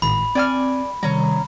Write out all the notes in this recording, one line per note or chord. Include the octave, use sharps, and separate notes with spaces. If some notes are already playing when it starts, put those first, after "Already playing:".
G#1 A2 B5
C4 D5 G#5 F6
C3 D#3 G3 C#4 A#5